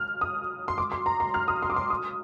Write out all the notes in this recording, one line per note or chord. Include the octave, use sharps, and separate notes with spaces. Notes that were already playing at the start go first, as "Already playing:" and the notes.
Already playing: F6
D#6
C6
D6
C6
A#5
C6
F6
D#6
C6
D6
C6
D#6